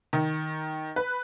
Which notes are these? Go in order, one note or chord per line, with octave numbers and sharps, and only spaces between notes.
D#3
B4